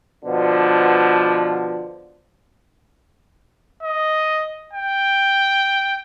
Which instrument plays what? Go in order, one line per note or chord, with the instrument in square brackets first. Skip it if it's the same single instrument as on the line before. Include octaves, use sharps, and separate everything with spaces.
[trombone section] B2 D3 F3
[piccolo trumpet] D#5
G5